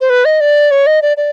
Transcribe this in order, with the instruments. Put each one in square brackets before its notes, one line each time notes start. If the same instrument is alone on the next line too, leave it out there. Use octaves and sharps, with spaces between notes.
[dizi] C5
B4
D#5
D5
C#5
D#5
D5
D5